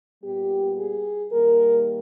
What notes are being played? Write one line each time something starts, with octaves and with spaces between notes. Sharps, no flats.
A#2 G3 B3 G4
G#4
D#3 G3 A#3 A#4